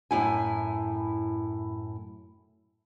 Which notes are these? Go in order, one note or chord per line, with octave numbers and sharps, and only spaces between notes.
F#2 A2 E4 G#5